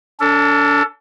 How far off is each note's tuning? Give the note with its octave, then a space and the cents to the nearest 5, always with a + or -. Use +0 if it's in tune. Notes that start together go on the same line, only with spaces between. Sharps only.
D4 -40 A4 +25